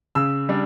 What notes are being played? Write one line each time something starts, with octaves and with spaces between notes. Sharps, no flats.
C#3 E6
G3 D4